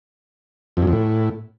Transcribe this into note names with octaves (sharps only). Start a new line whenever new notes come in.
F2
F#2
F2
A2